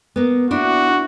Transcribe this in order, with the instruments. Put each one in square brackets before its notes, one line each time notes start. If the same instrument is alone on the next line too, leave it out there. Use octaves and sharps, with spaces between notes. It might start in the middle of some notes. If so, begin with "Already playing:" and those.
[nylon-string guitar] A#3 B3
[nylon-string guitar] D4 E4 [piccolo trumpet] F#4